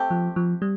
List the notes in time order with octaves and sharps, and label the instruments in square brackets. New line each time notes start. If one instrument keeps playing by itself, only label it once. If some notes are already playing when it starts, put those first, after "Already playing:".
Already playing: [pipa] A3 C4 G4
[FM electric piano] F3
F3
G3